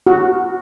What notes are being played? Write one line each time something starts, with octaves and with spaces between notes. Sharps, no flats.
F#4